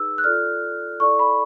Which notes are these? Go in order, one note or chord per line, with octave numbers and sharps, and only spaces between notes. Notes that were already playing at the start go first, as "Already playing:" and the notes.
Already playing: D#4 G#4 B4 E6
F#6
F4 A4 D5 F6
E4 A4 D5 C#6
B5